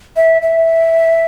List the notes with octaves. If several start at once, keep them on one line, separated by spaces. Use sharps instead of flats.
E5
E5